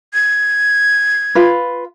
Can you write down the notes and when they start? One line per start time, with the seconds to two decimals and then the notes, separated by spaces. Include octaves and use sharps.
0.14 G#6
1.35 F4 B4